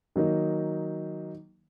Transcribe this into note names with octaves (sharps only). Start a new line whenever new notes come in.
D#3 F#3 A#3 D#4